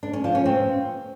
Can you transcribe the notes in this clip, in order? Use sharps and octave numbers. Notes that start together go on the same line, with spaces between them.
D4
C#4
F3
C#4
C4